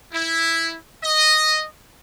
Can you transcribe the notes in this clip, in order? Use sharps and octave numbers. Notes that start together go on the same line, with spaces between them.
E4
D#5